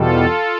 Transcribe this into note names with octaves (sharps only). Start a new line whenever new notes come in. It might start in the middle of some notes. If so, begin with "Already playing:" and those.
Already playing: E2 B2 G3 F4 A4